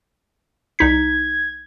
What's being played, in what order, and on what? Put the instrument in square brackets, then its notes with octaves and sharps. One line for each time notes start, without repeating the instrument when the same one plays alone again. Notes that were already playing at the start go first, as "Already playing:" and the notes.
[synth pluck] C2 D#4 B6 [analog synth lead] G#6